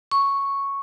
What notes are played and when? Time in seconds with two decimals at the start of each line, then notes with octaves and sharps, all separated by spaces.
0.11 C#6